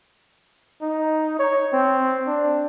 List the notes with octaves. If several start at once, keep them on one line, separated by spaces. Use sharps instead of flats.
D#4
C#5
C4
D4